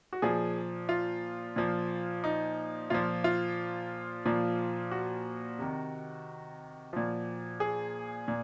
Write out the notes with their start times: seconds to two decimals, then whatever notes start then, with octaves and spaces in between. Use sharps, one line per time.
0.13 F#4
0.22 A#2 F3 G#4
0.89 F4
1.56 A#2 F3
2.24 D#4
2.90 A#2 F3 F4
3.24 F4
4.25 A#2 F3
4.91 F#4
5.59 C3 D#3
6.93 A#2 F3
7.60 G#4
8.28 A#2